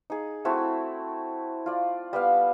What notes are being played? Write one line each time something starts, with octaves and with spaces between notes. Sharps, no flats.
D#4 G#4
A3 C4 E4 F#4
F4 D5
G3 B3 F5